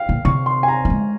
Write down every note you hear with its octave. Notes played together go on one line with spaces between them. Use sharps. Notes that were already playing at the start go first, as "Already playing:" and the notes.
Already playing: F5 G5
A#2
C3 C#6
C6
G#5
A#5
G3
G#3